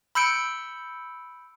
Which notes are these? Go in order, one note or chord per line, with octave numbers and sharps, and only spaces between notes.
B5 E6 G6 C#7 D7